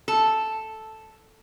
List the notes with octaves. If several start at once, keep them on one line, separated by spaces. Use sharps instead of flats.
A4